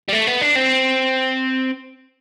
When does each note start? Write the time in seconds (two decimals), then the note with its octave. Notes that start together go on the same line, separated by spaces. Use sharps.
0.09 G3
0.13 A3
0.27 B3
0.42 D4
0.56 C4